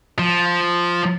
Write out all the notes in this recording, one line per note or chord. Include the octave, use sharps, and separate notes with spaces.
F3